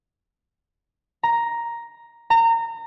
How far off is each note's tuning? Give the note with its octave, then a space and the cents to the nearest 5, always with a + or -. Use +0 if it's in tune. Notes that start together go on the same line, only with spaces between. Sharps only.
A#5 +5
A#5 -25